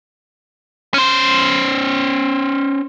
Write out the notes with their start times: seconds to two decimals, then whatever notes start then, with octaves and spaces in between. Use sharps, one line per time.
0.94 C#4 C5